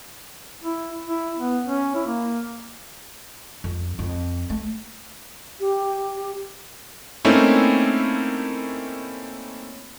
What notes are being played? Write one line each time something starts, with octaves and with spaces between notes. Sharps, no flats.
E4
E4
B3
C#4
E4
A#3
F2
F2
A3
G4
A3 A#3 C4 C#4 D#4 E4